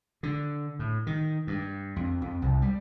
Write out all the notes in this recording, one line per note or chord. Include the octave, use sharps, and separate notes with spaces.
D3
A2
D#3
G2
F2
F2
C2
G3